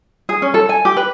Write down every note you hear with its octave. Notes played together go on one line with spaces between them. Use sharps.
G#4
C#4
A4
G#5
G4
B4